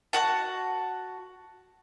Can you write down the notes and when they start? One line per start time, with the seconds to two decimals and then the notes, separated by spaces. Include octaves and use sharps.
0.13 F#4 F#5 A5